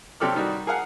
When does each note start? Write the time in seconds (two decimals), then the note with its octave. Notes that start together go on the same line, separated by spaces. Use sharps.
0.20 C3 F#3 G4 A4 D5 F6
0.35 D#3 G3 D#4 F#4
0.67 G#4 A#4 F5 F#5